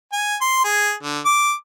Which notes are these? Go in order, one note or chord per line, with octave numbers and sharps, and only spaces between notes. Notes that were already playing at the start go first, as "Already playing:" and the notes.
G#5
C6
G#4
D3
D6